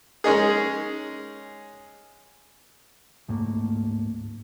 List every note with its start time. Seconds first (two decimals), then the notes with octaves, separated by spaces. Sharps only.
0.24 G#3 C#4 D#4 G#4
3.28 D1 G#2 A3 A#3